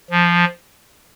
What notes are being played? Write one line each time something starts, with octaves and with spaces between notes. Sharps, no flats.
F3